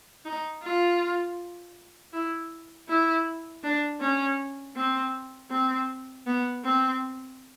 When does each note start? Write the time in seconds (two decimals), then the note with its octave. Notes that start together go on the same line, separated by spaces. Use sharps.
0.25 D#4
0.63 F4
2.13 E4
2.88 E4
3.63 D4
4.00 C#4
4.76 C4
5.51 C4
6.26 B3
6.64 C4